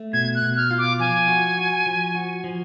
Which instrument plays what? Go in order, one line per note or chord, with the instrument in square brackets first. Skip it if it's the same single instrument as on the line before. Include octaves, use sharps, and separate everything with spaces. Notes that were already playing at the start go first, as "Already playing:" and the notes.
Already playing: [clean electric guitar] A3
[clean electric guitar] B2 [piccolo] G#6
[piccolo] F#6
[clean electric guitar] B2
[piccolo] F6
[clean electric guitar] F4
[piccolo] D6
[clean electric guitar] F3 [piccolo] G#5
[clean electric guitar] F#4
F#4
F3
F#4
F3